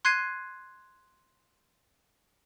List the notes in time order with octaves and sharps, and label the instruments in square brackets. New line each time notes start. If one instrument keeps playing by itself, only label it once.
[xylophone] C6 F#6 G#6 C7 D#7